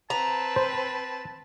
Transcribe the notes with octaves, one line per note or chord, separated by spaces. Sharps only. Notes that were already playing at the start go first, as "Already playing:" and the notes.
C4 B4 A5 A#5
C5